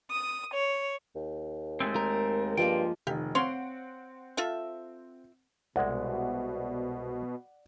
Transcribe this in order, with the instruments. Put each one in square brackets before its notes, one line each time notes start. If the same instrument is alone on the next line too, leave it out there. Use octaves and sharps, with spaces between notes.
[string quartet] D#6
C#5
[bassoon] D#2
[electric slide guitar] G#3 A3 C4
[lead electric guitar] A#4
[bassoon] G2 [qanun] F3 G#3 A#3 [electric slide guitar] G5
[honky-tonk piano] F1 D#3 [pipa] G4
[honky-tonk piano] C4 F#5 D7 [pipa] C#5 F5 C6
[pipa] F4 A4 E5
[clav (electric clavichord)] C2 G#3 [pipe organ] B2 [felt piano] D5 F#5